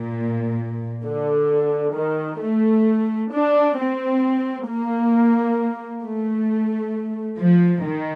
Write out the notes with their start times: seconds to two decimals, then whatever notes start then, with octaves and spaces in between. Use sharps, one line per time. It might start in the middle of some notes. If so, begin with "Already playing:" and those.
Already playing: A#2
1.05 D3
1.96 D#3
2.40 A3
3.32 D4
3.77 C4
4.67 A#3
6.04 A3
7.39 F3
7.84 D#3